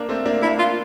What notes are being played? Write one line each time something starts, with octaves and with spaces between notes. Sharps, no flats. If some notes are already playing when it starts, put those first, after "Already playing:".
Already playing: A#3 D4
A3 C4
A#3 D4
A#3 D4 E4
F4